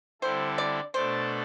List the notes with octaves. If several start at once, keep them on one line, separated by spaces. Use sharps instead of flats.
D3 G3 C4 E4 A4 C5
D5
B2 A3 D4 A4 C5 D5